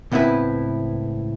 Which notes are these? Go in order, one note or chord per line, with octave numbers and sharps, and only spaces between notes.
C#2 A2 B3 C4 E4 B4